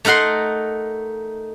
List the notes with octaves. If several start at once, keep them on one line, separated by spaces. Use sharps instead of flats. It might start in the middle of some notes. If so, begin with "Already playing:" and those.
A3 D#4 A#4 F#5 C6